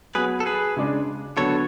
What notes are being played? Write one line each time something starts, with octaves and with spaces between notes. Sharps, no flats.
F#3 B3 F#4 G#4 B4
A4
G#4 B4
C#3 G#3 D4
D3 F#3 B3 A4 C#5